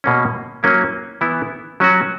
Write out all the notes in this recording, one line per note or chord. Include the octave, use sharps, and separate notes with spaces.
B2 A#3 C#4
F#3 A#3 C#4 E4
E3 B3 E4
F#3 C#4 F#4